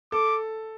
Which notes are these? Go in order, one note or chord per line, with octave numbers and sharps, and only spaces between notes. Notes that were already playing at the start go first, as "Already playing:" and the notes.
A4 D6